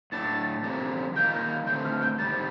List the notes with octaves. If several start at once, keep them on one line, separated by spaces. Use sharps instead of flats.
A2 A3 D4 A6
D3 F3 C4 G4 A#4
D#3 G3 A#3 F4 A#4 G6
D3 A3 C4 G6
F6
G6
D#3 G3 C4 A6